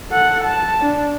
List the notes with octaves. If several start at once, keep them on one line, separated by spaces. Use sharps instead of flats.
A4 F#5
A5
D4